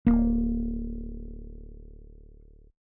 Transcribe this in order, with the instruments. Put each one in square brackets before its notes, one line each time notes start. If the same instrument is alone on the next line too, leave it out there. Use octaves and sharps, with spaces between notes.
[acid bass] D1 [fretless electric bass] A#3